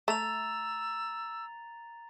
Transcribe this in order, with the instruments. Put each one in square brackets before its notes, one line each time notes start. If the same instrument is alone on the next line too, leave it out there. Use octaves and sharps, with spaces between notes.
[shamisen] A3 [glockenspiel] A#5 A6 F7 [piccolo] E6